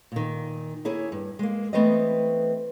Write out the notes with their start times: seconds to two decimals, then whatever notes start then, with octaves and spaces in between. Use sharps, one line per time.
0.12 A#2 D#3
0.85 A#3 E4 G#4 C#5
1.12 G2
1.39 G#3 A#3
1.73 E3 A3 B3 C4 B4 D#5